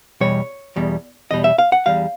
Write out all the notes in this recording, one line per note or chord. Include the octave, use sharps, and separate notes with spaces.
E2 B2 G3 C#5
E2 B2 G3
E2 B2 G3 D#5
E5
F5
F#5
E2 B2 G3 F5